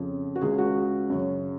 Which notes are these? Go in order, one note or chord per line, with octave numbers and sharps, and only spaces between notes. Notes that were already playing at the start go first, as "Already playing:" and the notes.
Already playing: F2 C#3
F#4
C#2 C#3 G#4
F#4
F#2 C#3